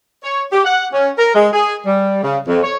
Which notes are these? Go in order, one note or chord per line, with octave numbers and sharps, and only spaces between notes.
C#5
G4
F#5
C#4
A#4
G#3
G#4
G3
C#3
F2
C#5